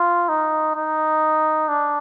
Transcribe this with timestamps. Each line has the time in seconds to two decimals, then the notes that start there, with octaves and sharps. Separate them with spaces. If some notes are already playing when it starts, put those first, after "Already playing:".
Already playing: F4
0.29 D#4
0.76 D#4
1.69 D4